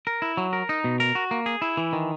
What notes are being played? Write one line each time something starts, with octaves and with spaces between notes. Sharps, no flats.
A#4
E4
F#3
A#4
D#4
B2
A#4
F#4
A#3
G#4
E4
E3
D#3